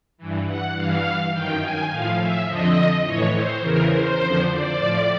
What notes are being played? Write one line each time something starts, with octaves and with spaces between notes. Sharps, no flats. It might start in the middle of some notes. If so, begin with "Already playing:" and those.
G2 E3
F#5
G2 E3 F5
F#2 D#3 G5
G#5
A2 F3 F5
E5
F2 D3 F3 D#5
A2 E3 C#5
C5
E2 C#3 E3 A#4
C5
F2 D3 F3
D5
A2 F3